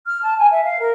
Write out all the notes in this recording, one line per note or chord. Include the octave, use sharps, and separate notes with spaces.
F6
A5
G#5
E5
F5
A#4